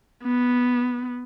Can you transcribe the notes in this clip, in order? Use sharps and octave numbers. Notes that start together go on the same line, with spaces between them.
B3